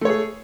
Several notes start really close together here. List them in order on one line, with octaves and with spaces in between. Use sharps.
A3 C#5 G#4